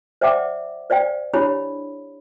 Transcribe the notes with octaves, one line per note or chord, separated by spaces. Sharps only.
C5 D5 E5 F#5 G5 D6
C5 D5 F5 G5
D4 E4 G4 C#5 B5